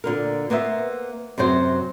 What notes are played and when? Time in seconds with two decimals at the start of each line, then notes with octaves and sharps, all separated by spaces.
0.04 A#2 D3 A#4
0.50 A#3 B3 C5 C#5 E5
1.38 F#2 C3 F#3 C5